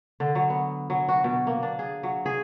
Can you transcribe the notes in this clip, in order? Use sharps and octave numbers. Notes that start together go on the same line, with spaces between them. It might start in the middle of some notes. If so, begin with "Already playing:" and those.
D3
F#3
B3
F#3
F#4
B2
A#3
D4
G#4
F#3
G#4